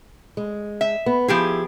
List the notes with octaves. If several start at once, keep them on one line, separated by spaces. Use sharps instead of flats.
G#3
E5
B3
F3 E4 G4 G#4